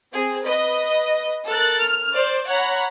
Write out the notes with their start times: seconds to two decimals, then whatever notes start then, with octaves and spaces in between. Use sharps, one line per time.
0.13 C4 G#4
0.44 B4 D#5
1.47 A4 A#4 F#6 A6
1.80 F6
2.14 C5 D5
2.48 C#5 F#5 A#5 B5